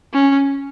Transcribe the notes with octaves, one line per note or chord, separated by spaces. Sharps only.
C#4